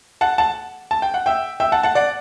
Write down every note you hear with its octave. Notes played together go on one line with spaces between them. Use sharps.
F#5 A5
F#5 A5
A5
G5
F#5
E5 G5
E5 G5
F#5 A5
F#5 A5
D5 F#5